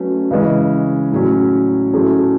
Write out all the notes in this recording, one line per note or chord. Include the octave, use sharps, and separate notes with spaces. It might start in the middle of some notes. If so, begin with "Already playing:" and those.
Already playing: F#3 A3 C#4 F#4 B4
C#3 E3 G#3 C#4
A2 F#3 C#4
A2 F#3 A3 C#4 G#4